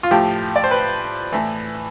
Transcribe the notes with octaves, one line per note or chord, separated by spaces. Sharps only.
F4
A2 F3 G4
D5
C5
B4
A2 E3